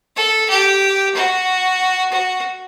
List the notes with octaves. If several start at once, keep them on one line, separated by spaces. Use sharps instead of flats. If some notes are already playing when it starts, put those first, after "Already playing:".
A4
G4
F#4
F#4